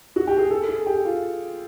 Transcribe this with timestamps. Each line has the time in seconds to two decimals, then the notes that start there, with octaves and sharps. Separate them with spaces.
0.16 F#4
0.27 G4
0.38 G#4
0.51 A4
0.69 G#4
0.86 G4
1.05 F4